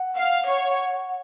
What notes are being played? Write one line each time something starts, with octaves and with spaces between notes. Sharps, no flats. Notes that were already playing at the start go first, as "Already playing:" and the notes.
Already playing: F#5
F5
C#5